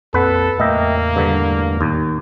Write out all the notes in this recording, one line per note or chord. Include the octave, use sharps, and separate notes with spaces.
F2 A#3 C4 A4 B4 F#5
E2 A2 A3 A#3 D#5 E5 G5
G2 D3
D#2